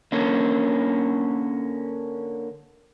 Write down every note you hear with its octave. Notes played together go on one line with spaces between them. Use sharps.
D3 A#3 C#4